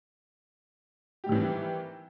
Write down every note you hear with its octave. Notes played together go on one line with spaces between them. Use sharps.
D#3 E3 G3 C4 G4